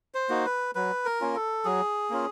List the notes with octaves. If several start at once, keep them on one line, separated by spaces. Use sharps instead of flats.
C5
A#3 D#4 F#4
B4
F#3 B4
A#4
A#3 C#4 F4
A4
F#3 G#4
A#3 C#4 F4